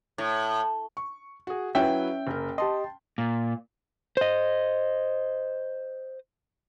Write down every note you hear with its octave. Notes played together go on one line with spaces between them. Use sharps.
A2
C#6
F#4 G#4
F#3 C#4 E4 B4 E5 G5
F#1 A#4
G4 D#5 A5 C6
A#2
C5 D#5